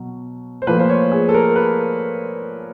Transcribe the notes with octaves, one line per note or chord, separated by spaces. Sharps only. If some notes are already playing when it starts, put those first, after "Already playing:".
Already playing: B2 F#3
C5
A#2 F3 A3 B4
C5
C#5
G#4
A4
A#4
B4